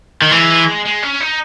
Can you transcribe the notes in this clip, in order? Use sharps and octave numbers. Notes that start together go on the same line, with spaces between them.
D#3
E3 G#3
G#3
C#4
D#4